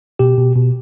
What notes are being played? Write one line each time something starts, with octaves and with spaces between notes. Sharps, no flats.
B2 G4
B2
B2